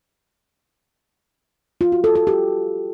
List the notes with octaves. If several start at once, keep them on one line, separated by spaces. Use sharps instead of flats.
F4
F#4
A4
A4
G4